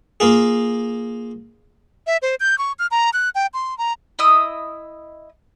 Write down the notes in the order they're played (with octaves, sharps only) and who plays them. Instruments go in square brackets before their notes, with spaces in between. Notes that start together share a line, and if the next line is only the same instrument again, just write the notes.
[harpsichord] A#3 F4 G#4
[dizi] E5
C5
G6
C#6
F6
A#5
F#6
G5
C6
A#5
[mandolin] E4 D#5 D#6 E6